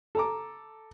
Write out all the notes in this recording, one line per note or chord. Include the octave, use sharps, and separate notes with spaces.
A4 A#5 D6